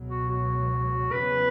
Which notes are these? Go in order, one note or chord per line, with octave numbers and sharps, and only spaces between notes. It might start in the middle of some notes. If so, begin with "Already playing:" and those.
Already playing: C#2 B2 F#3
F#4
F#4
E2 C#3 F#3 C#4 B4